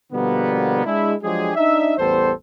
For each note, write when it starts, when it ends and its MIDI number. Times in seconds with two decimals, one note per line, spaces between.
0.13 0.81 47
0.13 0.81 50
0.13 0.81 53
0.13 0.81 55
0.13 0.81 58
0.13 0.81 59
0.85 1.14 56
0.85 1.14 62
0.85 1.14 64
1.23 1.51 53
1.23 1.51 54
1.23 1.51 56
1.23 1.51 62
1.23 1.51 67
1.23 1.51 68
1.56 1.97 62
1.56 1.97 63
1.56 1.97 76
1.98 2.32 33
1.98 2.32 40
1.98 2.32 55
1.98 2.32 59
1.98 2.32 69
1.98 2.32 72